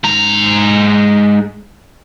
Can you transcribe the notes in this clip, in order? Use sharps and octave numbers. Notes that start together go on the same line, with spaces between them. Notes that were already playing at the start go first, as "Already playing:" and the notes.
G#2 A#5